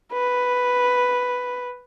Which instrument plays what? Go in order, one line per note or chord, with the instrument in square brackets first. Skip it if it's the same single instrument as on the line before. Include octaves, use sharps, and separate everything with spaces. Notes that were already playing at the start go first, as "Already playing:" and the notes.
[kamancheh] B4